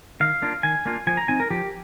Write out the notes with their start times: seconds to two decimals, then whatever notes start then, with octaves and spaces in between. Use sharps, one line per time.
0.20 D#3 F5
0.42 A#3 D4 F4
0.63 D#3 G#5
0.85 A#3 D4 F4
1.07 F3 G#5
1.17 A#5
1.28 C4 D#4 G#5
1.40 A#4
1.50 F3 G4